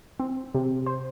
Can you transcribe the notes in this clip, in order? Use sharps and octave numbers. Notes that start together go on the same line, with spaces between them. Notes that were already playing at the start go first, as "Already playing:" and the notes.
C4
C3
C5